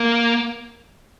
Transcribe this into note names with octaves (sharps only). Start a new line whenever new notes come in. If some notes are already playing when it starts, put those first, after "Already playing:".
Already playing: A#3